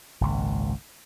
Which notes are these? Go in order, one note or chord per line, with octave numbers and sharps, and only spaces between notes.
G#1 C#2 A#2